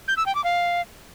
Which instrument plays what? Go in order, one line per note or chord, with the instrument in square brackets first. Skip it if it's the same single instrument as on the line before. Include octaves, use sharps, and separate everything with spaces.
[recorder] G6
E6
G5
D6
F5